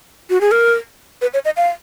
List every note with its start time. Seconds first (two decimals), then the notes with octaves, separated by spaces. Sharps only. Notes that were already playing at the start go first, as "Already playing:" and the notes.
0.30 F#4
0.41 G#4
0.51 A#4
1.22 B4
1.34 C#5
1.45 D#5
1.57 F5